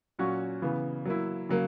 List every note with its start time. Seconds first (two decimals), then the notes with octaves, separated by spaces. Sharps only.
0.19 A#2 F#3 C#4 F#4
0.62 C#3 E3 B3
1.05 F#3 A#3 E4
1.49 C#3 F#3 A#3